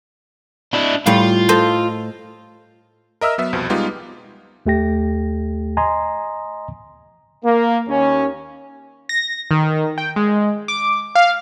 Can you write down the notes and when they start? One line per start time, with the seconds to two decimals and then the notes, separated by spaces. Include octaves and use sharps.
0.74 D4 E4
1.06 A2 G3 F4
1.49 A4 C5 D#5
3.21 A#4 D#5 E5 E6 F6
3.38 F#3 B3 E5
3.53 C2 F2 B2 F3
3.70 G3 G#3 B3 D#4 F4 G4
4.66 D#2 A3 G4 G5 A#6
5.77 D#5 G#5 A#5 C6 D#6
7.44 A#3
7.88 D#2 C#4
9.09 A#6
9.51 D#3
9.98 G5
10.16 G#3
10.68 D6
11.15 F5